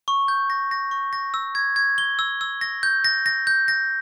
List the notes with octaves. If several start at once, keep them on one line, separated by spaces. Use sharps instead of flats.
C#6
G6
A#6
A#6
C#6
A#6
E6
G#6
G#6
G7
E6
E6
A#6
G6
A#6
A#6
G6
A#6